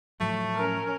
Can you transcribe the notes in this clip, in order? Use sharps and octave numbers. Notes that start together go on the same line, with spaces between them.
A2 F3 F#3 A3
C#4 A#4